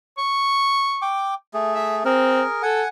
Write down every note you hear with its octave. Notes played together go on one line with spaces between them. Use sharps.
C#6
G5 D6
A3 G#4
E5
C4 G#4 A#4
A4 F#5 G#5